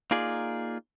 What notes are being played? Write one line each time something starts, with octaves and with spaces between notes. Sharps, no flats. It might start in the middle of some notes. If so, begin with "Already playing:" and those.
A#3 D#4 F4 G#4 D5